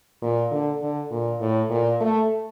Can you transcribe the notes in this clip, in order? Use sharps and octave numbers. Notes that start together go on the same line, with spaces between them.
A#2
D3
D3
A#2
A2
A#2
A3